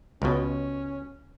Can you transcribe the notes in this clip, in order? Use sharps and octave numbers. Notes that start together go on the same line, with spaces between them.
C#2 B2 C#4